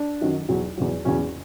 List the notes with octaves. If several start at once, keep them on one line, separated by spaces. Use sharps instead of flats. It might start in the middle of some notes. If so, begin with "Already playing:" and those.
Already playing: D4
F#2 D#3 F#3
E2 B2 F#3
E2 B2 F#3
E2 B2 F#3 C#4